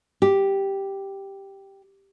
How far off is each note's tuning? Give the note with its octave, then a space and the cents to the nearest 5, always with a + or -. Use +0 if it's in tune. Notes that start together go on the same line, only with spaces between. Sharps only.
G4 +0